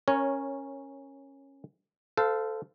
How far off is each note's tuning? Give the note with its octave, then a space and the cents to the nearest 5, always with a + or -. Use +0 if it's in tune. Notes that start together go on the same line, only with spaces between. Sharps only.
C#4 -15 A#4 +0 C#5 +0
A4 +0 C5 -30 F5 +0